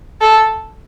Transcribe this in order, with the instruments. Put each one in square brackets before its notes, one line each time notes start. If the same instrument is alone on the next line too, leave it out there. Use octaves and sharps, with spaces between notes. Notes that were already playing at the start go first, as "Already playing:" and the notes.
[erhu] A4